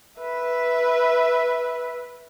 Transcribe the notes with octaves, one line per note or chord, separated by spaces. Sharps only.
B4 E5